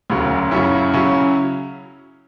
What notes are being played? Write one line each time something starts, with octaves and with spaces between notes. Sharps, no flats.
E1 D2 C#3 F#3
F#2 C#3 F#3 C#4 E4
C#3 F#3 C#4 E4